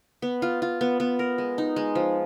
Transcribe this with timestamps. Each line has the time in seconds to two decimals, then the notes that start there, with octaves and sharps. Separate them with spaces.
0.22 B3
0.42 F4
0.62 F4
0.81 B3
1.00 B3
1.19 A#4
1.38 G#3
1.58 D#4
1.76 G#3
1.95 F3